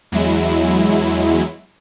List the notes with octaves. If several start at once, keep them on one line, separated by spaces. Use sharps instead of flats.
E2 F#3 G#3 E4